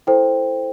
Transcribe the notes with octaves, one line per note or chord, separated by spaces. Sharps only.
E4 A4 C5 G5